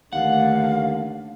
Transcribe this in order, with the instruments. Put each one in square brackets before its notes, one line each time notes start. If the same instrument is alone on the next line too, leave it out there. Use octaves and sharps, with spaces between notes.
[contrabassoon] D#2 [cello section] D3 A3 [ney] F5 [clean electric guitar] F#5